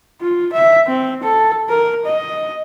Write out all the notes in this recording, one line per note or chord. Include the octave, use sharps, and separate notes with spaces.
F4
E5
C4
A4
A#4
D#5